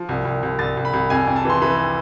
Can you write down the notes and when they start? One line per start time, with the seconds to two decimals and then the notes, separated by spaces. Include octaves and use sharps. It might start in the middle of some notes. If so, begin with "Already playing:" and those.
Already playing: F3
0.09 C2
0.25 C2
0.43 C2
0.59 C2 A6
0.77 C2
0.85 B5
0.93 C2
1.10 F2 G#5
1.27 F2
1.36 A5
1.45 E3 C6
1.62 E3 B5